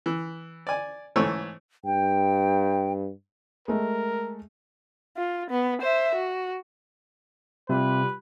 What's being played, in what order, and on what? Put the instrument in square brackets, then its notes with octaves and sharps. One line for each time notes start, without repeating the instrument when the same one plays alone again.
[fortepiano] E3
D5 G#5
G#2 E3 A3 C#5 G#5 E6
[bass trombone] G2 [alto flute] G5
[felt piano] G#3 A3 [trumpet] A#4
[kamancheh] F4
B3
C5 E5
F#4
[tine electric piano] C3 [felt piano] G3 F4 G4 [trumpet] B4